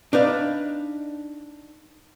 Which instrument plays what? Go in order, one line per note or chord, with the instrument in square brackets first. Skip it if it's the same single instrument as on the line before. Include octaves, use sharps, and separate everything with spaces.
[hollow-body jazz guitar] D4 D#4 B4 F5